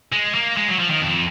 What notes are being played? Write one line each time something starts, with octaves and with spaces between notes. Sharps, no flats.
G#3
A#3
G#3
F#3
F3
D#3
F2